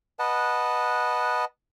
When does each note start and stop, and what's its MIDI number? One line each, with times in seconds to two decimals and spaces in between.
0.19 1.45 71
0.19 1.45 75
0.19 1.45 78
0.19 1.45 81